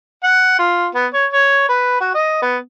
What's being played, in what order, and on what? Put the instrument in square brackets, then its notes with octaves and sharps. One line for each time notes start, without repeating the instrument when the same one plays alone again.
[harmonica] F#5
F4
B3
C#5
C#5
B4
F#4
D#5
B3